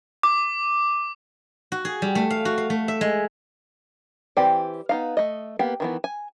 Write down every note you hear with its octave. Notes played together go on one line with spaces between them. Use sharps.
D6
F#4
G#4
G3
A3
F5
F#4
F5
A3
E5
G#3
E3 C4 G4 D5
B3 D#4 F5
A3 D#5
A#3 B3 G4
D#3 E3 B3
G#5